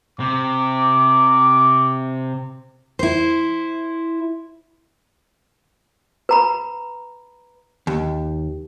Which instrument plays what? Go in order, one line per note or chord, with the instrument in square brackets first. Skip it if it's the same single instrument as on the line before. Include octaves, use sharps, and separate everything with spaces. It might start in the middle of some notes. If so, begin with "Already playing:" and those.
[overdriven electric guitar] C3 [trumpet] D6
[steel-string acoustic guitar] E4 C5
[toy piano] B4 A#5 B5
[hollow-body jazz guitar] D#2